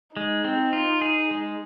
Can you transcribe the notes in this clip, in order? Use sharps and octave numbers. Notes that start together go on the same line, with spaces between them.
G#3 D#4
C4
F4
G#4
G#3